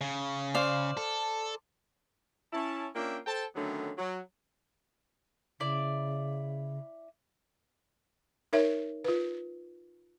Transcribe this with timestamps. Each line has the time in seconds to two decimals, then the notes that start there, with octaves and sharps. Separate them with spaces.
0.01 C#3
0.54 C5 D5 F5
0.97 A4
2.52 C#4 E4 A5
2.95 A#3 C#4 D4 F4 E5 G5
3.26 A4 C5 G5 A5
3.56 D3 D#3 F#3 A3 B3 C#4
3.98 F#3
5.60 C#3 E4 D5
8.53 D#4 A#4 C#5 E5
9.04 F4 B4